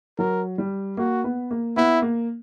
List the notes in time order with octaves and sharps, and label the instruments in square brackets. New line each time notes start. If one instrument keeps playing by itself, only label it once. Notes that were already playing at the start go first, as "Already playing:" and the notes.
[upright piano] F#3 [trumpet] A#4
[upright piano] G3
[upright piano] A#3 [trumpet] F#4
[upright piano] B3
A#3
[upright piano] B3 [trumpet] E4
[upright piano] A#3